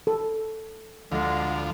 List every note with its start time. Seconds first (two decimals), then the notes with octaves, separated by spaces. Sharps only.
0.07 A4
1.12 D2 D3 F3 G#3